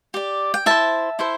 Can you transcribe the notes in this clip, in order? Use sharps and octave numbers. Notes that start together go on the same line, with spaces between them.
G4 D5
G5
E4 C5 E5 A5
E4 A4 C5